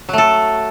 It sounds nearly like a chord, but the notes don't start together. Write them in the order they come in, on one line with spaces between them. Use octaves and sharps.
F#3 A3 A4